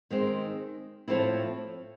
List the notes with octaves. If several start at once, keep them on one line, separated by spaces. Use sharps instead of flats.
D#3 G#3 C4
A2 F3 A3 C4 E4